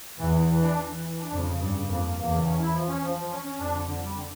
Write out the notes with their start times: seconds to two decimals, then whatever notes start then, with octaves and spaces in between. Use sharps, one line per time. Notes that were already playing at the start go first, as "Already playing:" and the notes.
0.19 E2 E3
0.33 E3
0.48 E3
0.62 D4
0.76 E3
0.91 E3
1.05 E3
1.19 D4
1.33 F2 C#3
1.47 C#3
1.60 G2 C#3
1.74 C#3
1.88 F2 A#3
2.03 A#3
2.17 E2 A#3
2.31 C#3
2.45 C#4
2.59 E4
2.73 F3
2.88 C#4
3.02 F3
3.16 F3
3.30 C#4
3.44 C#4
3.58 F2 D4
3.72 D3
3.87 D3
4.01 G3
4.15 D3